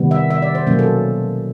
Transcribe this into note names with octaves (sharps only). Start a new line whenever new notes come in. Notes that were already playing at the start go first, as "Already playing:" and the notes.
Already playing: C3 D#3 G3 B3
E5
E5
D5
C5
B2 F#3 A#3 C#4
A4